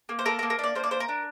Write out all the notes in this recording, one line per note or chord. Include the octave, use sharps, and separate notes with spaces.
A#3
C5
A4 A#4
A#4
A#3
A#4
D4 D5
A#3 C5
D5
D4 C5
A#4
D4